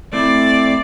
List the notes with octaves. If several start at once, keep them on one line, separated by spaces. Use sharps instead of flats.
A3 C4 E4 D5